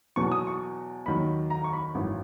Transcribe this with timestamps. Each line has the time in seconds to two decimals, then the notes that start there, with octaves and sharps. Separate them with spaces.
0.16 E2 B2 F#3 C#6
0.32 D#6
0.47 C#6
1.06 D#2 D#3 F#3 B5
1.50 A#5
1.64 C#6
1.73 B5
1.95 G#1 F#2 E3